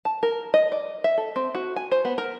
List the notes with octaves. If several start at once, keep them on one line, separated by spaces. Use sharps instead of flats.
A5
A#4
D#5
D5
E5
A4
C4
F#4
G#5
C5
B3
A#4